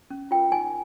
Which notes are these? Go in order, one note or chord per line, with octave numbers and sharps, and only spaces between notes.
C#4
F4 A#4 G5
D#4 G#5